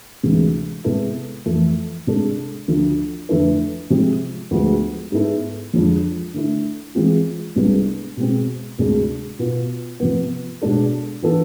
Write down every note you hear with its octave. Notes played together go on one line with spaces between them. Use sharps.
D2 C3 E3 G#3
C3 G#3 B3 E4 A4
F2 E3 A3
C3 G#3 D4 A4
D2 D3 F3 A3
F2 D3 A3 E4 B4
C3 F3 G#3 C4 G#4
D2 D3 F3 G#3 B3
G#2 G#3 B3 E4 A4
F2 D3 F3 G#3 D4
D3 A3 E4
E3 G#3 C4 F4
C2 C3 G#3 B3 D4
B2 G#3 C4
D2 C3 G#3 D4 G#4
B2 B3 F4
C3 F3 B3
B2 G#3 D4 A4
E3 B3 D4 F4 A4